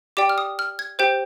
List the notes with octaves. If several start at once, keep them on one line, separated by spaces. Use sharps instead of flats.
G4 D5 G5 D6
F6
D#6
F6
G#6
G4 C5 G5 G6